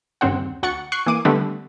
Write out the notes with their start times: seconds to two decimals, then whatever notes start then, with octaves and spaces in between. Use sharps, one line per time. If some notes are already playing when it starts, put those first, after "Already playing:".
0.21 G1 D#2 C#3 C4 F#5
0.63 D2 F#5 C#6 A6 C#7
0.92 C#6 F#6 C7
1.06 E3 A#3 D6 D#7
1.25 D3 G3 A3 B3